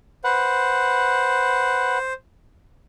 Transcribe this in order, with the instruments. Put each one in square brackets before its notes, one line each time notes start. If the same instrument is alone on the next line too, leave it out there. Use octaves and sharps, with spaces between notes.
[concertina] B4 F#5 [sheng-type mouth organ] C5